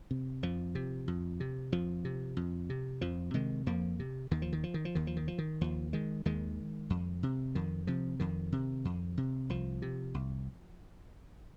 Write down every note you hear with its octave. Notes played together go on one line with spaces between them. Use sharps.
C3
F2 F3
C3
F2
C3
F2 F3
C3
F2
C3
F2 F3
C3 D#3 G#3
F2 F3 A#3
C3
D#2 D#3
F3
D#3
F3
D#3
F3
D#2 D#3
F3
D#3
F3
D#3
D#2 F3
D#3 G#3
D#2 D#3 G#3
F2
C3
F2 D#3
C3 F3
F2 D#3
C3
F2
C3
C2 F3
C3
C2